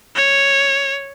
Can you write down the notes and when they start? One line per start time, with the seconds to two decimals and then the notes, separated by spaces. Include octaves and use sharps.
0.15 C#5